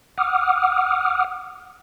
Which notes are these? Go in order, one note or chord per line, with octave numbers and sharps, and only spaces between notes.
F#5 D6 D#6 F6